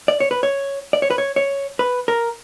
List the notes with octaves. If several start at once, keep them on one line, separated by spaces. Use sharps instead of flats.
D5
C#5
B4
C#5
D5
C#5
B4
C#5
C#5
B4
A#4